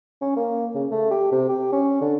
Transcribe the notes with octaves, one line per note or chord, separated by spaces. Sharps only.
C#4
A#3
C#3
A3
G4
C3
G4
C#4
D3